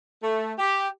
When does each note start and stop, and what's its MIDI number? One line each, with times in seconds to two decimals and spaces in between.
0.23 0.52 57
0.58 0.88 67